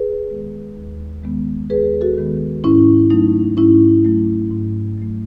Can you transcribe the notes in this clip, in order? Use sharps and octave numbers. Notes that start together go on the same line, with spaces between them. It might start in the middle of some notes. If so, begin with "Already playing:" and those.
Already playing: G#4 B4
D#3 G#3 B3
D#2
D#3 G#3 B3
D#2 G#4 B4
F#4 A4
D#3 G#3 B3
G#2 C#4 E4
F#3 A3 D#4
G#2 C#4 E4
F#3 A3
G#2
F#3 A3